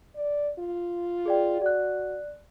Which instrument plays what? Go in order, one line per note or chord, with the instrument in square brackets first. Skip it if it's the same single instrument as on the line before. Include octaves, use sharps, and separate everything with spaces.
[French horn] D5
F4
[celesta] G#4 D5 G5
[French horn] F#4 [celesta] D5 F#6